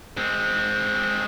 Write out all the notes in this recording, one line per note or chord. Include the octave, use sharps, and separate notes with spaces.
G#3 C4